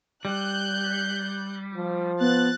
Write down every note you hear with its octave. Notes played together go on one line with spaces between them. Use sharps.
G3 F#6 G6
F3
B3 F#6 A6